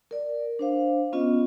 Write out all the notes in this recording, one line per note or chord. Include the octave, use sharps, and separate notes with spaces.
A#4 D5
D4 C5 F5
B3 C#4 F4 D#5